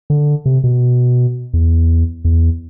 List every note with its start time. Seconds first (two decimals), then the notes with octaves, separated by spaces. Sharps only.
0.10 D3
0.46 C3
0.64 B2
1.54 E2
2.25 E2